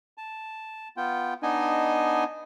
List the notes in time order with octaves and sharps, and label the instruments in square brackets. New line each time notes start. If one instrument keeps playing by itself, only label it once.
[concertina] A5
B3 F4 G5
B3 D4 D#4 D#5 G#5